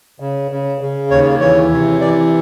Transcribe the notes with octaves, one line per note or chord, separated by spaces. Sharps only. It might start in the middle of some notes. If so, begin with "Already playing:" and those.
C#3
C#3
C#3
D#2 C#5
E3 C#5
C3
E3 D5